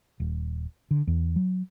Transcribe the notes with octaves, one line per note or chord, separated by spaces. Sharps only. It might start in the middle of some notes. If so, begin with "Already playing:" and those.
D#1
D3
E2
F#3